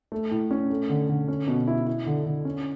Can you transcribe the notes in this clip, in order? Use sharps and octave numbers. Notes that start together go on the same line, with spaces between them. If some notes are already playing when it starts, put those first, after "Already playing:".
A3
A2
C#4
A3
D3
D3
C#4
B2
E4
E4
D3
D3
C#4